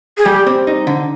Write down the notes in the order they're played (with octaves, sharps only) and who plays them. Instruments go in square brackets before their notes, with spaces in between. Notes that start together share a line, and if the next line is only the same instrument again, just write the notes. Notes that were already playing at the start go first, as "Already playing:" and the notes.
[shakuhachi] G#4
[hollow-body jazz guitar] G3 [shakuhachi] G4
[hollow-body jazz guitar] C4
D#4
D3